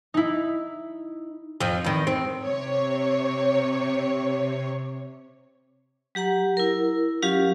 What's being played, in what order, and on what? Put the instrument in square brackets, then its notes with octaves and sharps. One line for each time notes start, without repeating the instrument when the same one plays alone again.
[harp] D#4 E4
[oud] F2 F3
E2 D#3
C4
[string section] C3 C#5
[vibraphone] F#3 G4 F#5 A#5
E4 A#4
F#3 C#4 F4 G4 F5